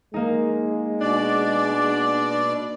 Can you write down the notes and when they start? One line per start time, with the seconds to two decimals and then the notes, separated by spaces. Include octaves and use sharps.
0.14 G#3 A#3 D#4
1.01 B2 D4 D5